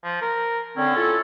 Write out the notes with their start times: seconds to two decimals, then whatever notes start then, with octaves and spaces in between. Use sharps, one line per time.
0.04 F3
0.21 A#4
0.77 D3 C4 C#4
0.96 E4 F4 A4